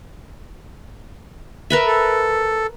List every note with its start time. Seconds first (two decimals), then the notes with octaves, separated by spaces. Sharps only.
1.70 A#4 B4 E5
1.86 A4